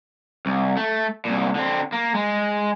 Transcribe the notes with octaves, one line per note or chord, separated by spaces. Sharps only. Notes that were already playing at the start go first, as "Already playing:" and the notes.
C2
A3
C2 A#2
D3 C4
A#3
G#3